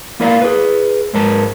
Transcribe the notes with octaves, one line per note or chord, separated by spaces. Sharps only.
A#3 E4 A#4 D5 F5
G#4 B4
G#2 G#3 A#4 B4 A5